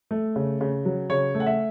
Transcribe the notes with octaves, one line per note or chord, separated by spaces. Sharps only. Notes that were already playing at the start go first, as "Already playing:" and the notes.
A3
C#3
C#3
F#3
C#3 C#5
A3
F#5
E5